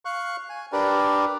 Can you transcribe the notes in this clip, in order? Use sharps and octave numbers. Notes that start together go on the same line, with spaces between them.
F5 C#6 F#6
G#5
D4 G4 A#4 B4 D5